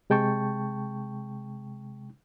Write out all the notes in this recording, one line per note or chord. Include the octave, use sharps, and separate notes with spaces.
C3 G#3 G5 A5 C#6